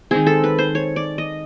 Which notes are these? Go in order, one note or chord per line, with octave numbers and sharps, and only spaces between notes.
D#3 G#3 C4 G#4
A4
B4
C5
C#5
D5
D#5